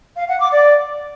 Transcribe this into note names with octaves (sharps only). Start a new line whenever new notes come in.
F5
F#5
D6
D5